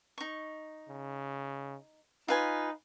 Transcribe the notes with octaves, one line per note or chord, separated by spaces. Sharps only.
D#4 C#6
C#3
D#4 F4 B4 G#5